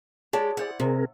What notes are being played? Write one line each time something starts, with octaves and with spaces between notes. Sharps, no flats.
G#3 G4 G#4 C#5 D5 A5
E4 C5 D5 F#5
C3 C4 G#4 A#4